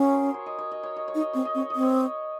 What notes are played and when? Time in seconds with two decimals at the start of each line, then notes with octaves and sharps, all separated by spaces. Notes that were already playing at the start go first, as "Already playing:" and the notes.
Already playing: C#4 F#4 G#4 A#4
0.14 C5
0.34 C#5
0.46 D#5
0.58 C#5
0.72 D#5
0.83 C#5
0.96 D#5
1.08 C#5
1.15 D#4
1.20 D#5
1.33 C4 C#5
1.45 D#5
1.55 C4
1.58 C#5
1.70 D#5
1.75 C4
1.82 C#5